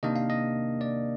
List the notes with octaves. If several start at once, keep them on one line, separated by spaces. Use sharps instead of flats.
C3 D#3 A#3 D4 D#5
F5
D#5
D5